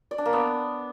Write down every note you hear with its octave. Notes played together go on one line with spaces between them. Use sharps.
D5
D4
A#3
B3